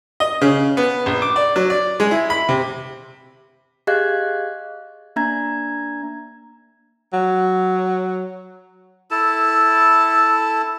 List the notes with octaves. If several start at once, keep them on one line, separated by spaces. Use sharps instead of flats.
D#5
C#3
B3
A#1
D6
D5
F#3
D5
G#3
E4
B5
C3
G4 G#4 D#5 F5 F#6 G#6
A#3 D4 E5 A#5 G#6
F#3
E4 A4 A5